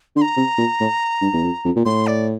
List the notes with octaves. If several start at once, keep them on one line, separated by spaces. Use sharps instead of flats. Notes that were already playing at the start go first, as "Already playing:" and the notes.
D3 C6
A#5
C3
A#2
A2
G2
E2
F2
F2
A#2
A2 C6
D5